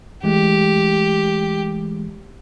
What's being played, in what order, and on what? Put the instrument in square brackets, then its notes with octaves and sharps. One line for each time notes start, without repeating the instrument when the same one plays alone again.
[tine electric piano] E3 G#3 A3 [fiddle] G4